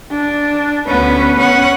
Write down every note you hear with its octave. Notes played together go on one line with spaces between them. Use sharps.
D4
D2 B3 C#4 B4
C#4 F#5